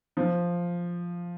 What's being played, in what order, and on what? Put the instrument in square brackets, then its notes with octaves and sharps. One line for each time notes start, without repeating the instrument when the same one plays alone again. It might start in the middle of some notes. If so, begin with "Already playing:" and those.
[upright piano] F3